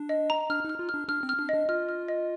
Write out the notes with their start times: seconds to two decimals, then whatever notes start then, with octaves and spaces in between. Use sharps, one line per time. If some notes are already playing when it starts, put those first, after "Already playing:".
Already playing: D4
0.09 D#5
0.30 A#5
0.50 D4 F6
0.65 D#4 F6
0.79 F4
0.89 F6
0.94 D4
1.09 D4 F6
1.23 C4
1.29 F6
1.39 D4
1.49 D#5
1.54 D4
1.69 F4 F6
1.89 F6
2.08 D#5